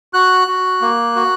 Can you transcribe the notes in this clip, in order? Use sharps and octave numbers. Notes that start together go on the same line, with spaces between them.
F#4 F#6
F#4
A#3
F#4